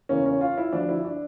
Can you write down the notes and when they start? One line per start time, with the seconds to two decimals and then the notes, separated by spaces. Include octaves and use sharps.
0.09 E2 C#3 E3 A#3 C#4
0.26 C#4
0.41 F4
0.58 E4
0.73 D2 D3 F3 D4
0.89 E4
1.05 D4